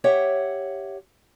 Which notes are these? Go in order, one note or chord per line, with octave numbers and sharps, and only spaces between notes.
G4 C#5 E5 F#5